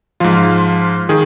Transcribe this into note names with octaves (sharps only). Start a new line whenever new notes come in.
G#2 F3 F4
D#3 G#4